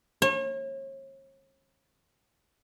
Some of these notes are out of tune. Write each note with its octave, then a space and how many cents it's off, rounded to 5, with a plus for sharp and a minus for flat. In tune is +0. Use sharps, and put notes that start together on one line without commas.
C#5 -40